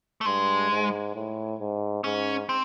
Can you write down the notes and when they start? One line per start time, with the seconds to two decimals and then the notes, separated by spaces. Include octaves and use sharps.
0.21 A3
0.26 G2 G#3
0.70 G#2
1.15 A2
1.60 G#2
2.04 G#2 C#4
2.49 C4